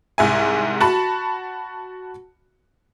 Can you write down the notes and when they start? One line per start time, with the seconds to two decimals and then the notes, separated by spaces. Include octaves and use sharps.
0.18 C2 G#2 E5 G#5
0.81 F#4 A5 B5